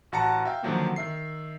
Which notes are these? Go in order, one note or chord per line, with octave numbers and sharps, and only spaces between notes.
A1 F#4 F#5 A5 A#5 C#7
E5 F5 G5
D3 D#3 F3 F#3 A#3 C4
D#3 E5 C7